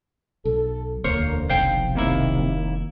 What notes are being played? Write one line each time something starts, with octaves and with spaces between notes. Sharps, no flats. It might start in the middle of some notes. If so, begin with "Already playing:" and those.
B1 A4
E1 D2 D3 A#3 A#4 C5 C#5
F1 B1 C5 F5 G5
D#2 C3 A#3 E4